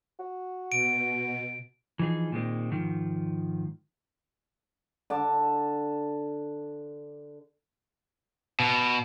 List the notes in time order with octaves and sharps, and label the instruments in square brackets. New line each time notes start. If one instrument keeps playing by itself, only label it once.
[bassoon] F#4
[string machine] B2 [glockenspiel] D7
[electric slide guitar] E3 F3 D#4 G#4
A#2 D#3 G#3 C4
G#2 D#3 F3
[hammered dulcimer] D3 A5 D6
[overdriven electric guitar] B2